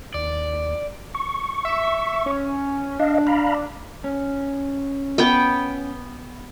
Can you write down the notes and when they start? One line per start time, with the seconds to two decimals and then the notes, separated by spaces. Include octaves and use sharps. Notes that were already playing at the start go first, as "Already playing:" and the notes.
0.14 D#2 D5
1.14 C#6
1.65 E5
2.26 C#4
2.99 D4 D#5 F5
3.27 F5 A#5 B5
4.04 C#4
5.18 B3 G5